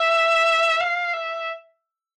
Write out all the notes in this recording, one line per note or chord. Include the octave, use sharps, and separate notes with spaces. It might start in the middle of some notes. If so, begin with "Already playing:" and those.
Already playing: E5
F5
E5